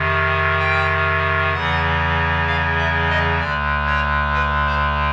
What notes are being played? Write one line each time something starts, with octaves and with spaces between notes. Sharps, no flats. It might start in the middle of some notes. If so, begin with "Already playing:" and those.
Already playing: F2 C3 D#3
G5
E2 C#3 E3 F#5
F5
E5
D#5
D2 D3 D5
C#5
B4
C5